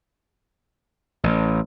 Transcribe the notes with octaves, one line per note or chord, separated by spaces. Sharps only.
A1